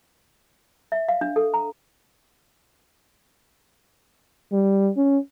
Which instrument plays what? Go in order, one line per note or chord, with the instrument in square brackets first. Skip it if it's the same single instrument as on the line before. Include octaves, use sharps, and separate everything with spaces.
[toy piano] E5
F5
D4
A4
A#5
[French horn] G3
C#4